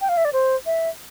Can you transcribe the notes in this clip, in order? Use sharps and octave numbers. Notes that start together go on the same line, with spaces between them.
G5
F5
E5
D5
C5
E5